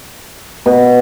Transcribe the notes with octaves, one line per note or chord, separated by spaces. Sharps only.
B2